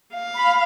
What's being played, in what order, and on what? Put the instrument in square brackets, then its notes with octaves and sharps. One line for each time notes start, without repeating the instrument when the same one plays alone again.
[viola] F5
[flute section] B5